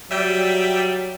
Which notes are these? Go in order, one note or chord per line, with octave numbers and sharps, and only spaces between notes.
F#3 G3 E5 G5